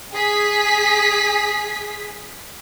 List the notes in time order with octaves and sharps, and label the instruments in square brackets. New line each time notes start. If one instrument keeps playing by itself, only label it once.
[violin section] G#4 B6